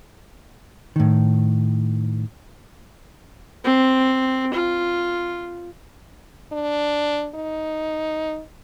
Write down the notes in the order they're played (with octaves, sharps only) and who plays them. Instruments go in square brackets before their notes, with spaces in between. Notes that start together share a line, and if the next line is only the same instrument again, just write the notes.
[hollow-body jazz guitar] A2 D#3
[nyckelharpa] C4
F4
[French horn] D4
D#4